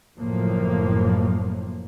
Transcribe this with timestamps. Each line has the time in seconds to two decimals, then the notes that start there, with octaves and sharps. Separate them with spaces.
0.17 F#1 A2 F3 A#3